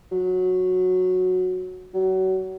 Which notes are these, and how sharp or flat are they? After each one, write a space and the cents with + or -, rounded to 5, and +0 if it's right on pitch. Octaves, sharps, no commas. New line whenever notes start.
F#3 -10
F#3 +30